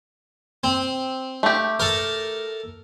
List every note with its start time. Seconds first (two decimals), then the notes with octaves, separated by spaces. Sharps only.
0.64 C4
1.43 A3 G4
1.80 A4 A#4